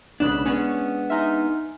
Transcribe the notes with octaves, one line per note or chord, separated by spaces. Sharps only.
B1 G#2 C#3 D4 B5 D#6 F#6 E7
G#3 B3 C#4 D4
D#4 E5 G#5 C6 F6